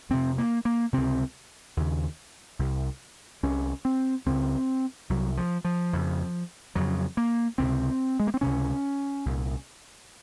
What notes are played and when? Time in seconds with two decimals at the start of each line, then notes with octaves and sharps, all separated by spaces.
0.10 F2 C3 C4
0.38 A#3
0.65 A#3
0.93 C#2 C3 C4
1.77 D#2 C#3
2.59 C2 C3
3.43 C2 C3 C#4
3.85 C4
4.26 C#2 C#3 C4
5.09 C2 C3 F#3
5.37 F3
5.65 F3
5.93 F2 C#3
6.75 F2 C#3 F#3
7.17 A#3
7.58 C#2 C3 C4
8.20 G#3
8.27 A#3
8.34 C4
8.41 C#2 C3 C#4
9.26 C2 A#2